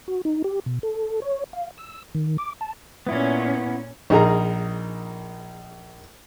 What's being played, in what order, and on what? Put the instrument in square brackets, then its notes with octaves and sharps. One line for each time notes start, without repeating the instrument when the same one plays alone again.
[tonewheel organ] F#4
D#4
G4
B2
A4
C#5
F5
E6
D#3
D6
A5
[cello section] A#2 C#4 [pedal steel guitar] B3 E4
[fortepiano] A#1 D#4 G#4 A#4 A#5